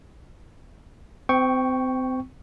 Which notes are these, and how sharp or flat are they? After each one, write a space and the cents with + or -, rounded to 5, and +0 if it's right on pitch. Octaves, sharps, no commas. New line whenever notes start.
C4 -30 G5 +0 C#6 +0